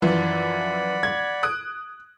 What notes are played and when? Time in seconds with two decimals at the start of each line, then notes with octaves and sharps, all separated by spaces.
0.02 F#2 E3 F3 D5 F#5 B5
1.03 G#6
1.43 D#6 F#6 D7